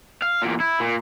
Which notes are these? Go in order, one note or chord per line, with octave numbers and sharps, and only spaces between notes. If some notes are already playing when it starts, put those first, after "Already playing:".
F5
E2 A#2
E4
A#2